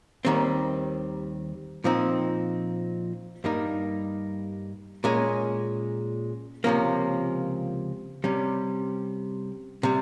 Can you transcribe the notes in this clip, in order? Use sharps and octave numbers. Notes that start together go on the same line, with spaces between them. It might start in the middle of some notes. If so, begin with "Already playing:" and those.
D#2 D#3 G3 C4
A#2 F3 C4 D#4
G2 G3 A#3 D#4
A#2 G#3 C#4
C#2 C3 F3 A#3 C#4
C3 G3 C#4
C3 G3